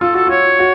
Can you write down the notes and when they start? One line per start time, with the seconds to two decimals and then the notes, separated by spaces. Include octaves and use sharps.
0.01 F4 A4
0.14 F#4 A4
0.27 F4 C#5
0.59 F#4